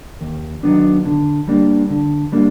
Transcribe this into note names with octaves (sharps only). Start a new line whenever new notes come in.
D#2
D#3 F#3 B3 D4
D3
G3 A#3 D4
D3
G3 A#3 D4